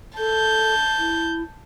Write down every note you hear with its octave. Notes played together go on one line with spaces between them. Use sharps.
A4 A5 G6
E4